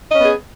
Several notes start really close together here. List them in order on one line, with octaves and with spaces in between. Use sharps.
D#5 C#4 B3 G#4